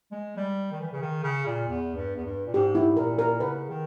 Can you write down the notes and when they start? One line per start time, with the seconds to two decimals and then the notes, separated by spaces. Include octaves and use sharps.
0.11 G#3
0.37 G3
0.72 D#3
0.81 E3
0.92 C#3
1.02 D#3
1.23 C#3
1.46 A#2
1.68 E2
1.95 G2
2.15 E2
2.24 G2
2.46 A#2
2.54 G#2 G4
2.75 E4
2.86 G#2
2.97 A#2 A#4
3.19 A#4
3.40 C#3 B4
3.69 D#3